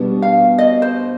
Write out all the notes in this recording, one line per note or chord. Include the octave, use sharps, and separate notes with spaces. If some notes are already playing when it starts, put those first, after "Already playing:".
Already playing: B2 G3 B3 D4
F5
D#5
C5